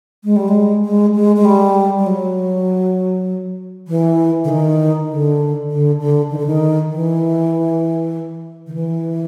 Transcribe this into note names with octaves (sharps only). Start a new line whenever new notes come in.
G#3
G3
G#3
G#3
G#3
G#3
G3
G3
F#3
E3
D3
D#3
D3
D3
D3
D#3
D3
D#3
E3
D#3
E3